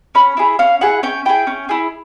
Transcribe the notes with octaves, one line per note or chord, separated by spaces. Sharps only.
C#4 B5
E4 G#4
C#4 F5
E4 G#4 F#5
C#4 G5
E4 G#4 G5
C#4
E4 G#4